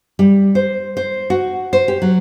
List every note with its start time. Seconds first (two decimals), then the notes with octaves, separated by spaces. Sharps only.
0.19 G3
0.55 C5
0.97 C5
1.30 F#4
1.73 C5
1.88 G4
2.02 F#3